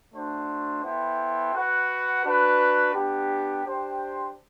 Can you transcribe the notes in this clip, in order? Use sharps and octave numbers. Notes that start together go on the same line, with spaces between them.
A3 D4 F#4 C5
B3 E4 A4 C5 G5
F#4 B4 F#5
D4 F#4 B4
B3 D4 G4
D4 G4 C5 G5